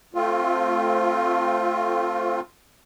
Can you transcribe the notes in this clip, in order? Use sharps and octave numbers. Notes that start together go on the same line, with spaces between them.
A3 C4 F4